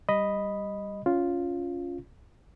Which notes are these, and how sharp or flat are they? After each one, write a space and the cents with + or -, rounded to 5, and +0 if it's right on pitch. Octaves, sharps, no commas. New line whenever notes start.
G3 +0 D#5 +0 B5 +0
C#4 +15 F4 +0